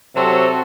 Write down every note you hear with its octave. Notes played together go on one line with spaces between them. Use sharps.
C3 F#3 C4 F#4 A4